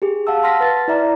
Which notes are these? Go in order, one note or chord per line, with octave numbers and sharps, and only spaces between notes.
G4 G#4
F5 F#5 A5 E6
A5 C6 F6 A#6 B6
B4 A6
E4 D5 E5 A#5